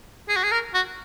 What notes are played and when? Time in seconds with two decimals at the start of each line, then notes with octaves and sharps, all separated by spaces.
0.29 G#4
0.36 F#4
0.44 G#4
0.52 A#4
0.74 F#4